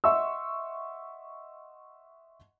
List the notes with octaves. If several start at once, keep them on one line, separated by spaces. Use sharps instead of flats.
D#5 E5 F#5 C6 C#6 E6